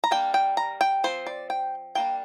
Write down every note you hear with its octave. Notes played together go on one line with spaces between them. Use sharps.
A#5
G3 A#3 D4 G5
G5
A#5
G5
F3 C4 C5
D5
G5
G3 A#3 D4 G5